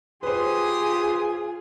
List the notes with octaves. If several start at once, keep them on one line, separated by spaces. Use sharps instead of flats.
F4 G4 G#4 B4 C5 C6 D#6